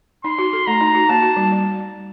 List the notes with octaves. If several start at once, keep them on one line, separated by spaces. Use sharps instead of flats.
D#4 C6
F#4
A4
A3 A#5
D#4
F#4
A#3 A5
F#4
G3
G3